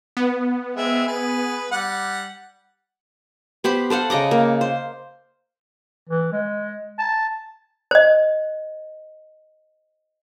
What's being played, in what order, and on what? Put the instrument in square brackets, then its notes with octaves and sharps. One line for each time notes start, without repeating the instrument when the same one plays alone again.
[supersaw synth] B3
[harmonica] G#3 C4 E5
G#4 B4
G3 F#5
[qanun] B3 G4 C5 B5
A4 C5 F5 F#5
C#3 D#5 A#5 D6
A#3
C5
[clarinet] E3
G#3
A5
[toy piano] C5 D#5